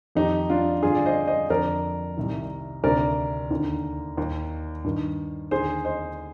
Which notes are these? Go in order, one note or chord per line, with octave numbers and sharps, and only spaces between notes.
F2 D#3 D#4 G4
D4 F4
G2 D3 F4 G#4
D5
C5 D#5
C5 D#5
F2 D3 A#4 D5
C2 C3 D#3
D2 C3 D#3 A#4 D5
D#2 D3
D#2 D#3
G2 D#3
D#2 D3 G#4 C5
C5 D#5